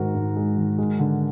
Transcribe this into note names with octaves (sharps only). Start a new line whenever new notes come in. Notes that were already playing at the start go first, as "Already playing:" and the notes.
Already playing: G#2 D#3 G#3 F#4 A#4
G#2
G#3
D#3
G#3
D3